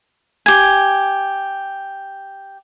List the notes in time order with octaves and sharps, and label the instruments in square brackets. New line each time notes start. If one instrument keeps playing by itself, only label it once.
[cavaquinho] G4 G#5